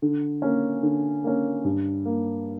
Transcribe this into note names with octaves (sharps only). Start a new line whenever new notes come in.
D3
A#3 C#4
D3
A#3 C#4
G2
A#3